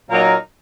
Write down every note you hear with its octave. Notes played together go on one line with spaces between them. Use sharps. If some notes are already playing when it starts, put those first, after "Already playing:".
A#2 F#3 A#3 D#4 A#4